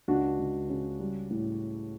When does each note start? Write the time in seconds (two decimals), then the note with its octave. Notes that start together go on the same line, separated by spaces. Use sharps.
0.08 C#2 D4 F#4
0.39 C#2
0.69 C#3
0.99 G3
1.31 A2